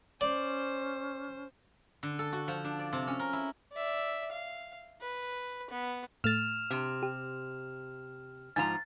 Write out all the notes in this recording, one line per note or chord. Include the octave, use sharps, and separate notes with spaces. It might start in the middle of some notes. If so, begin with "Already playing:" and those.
C#4 C5 D5
D3
A4
F#4
F3
D4
D5
C3
C#4
A#4
E4
D5 E5
F5
B4
B3
A2 A3 F6 A6 E7 F7
C3
G4
G#2 F3 G#5 A#5 A6